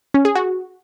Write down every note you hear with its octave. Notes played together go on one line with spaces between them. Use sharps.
C#4
G#4
F#4